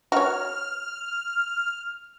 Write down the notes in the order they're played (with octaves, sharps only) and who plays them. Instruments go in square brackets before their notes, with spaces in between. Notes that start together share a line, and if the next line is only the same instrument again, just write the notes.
[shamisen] F#4 C#5 [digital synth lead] F6